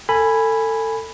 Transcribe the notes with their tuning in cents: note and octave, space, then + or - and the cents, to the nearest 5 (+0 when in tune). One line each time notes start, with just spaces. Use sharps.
A4 +25 G#5 -5 B5 +0